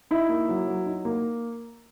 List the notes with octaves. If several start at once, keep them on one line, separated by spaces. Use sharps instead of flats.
D#4 E4
A#3
F#3
F#3
D#4
A#3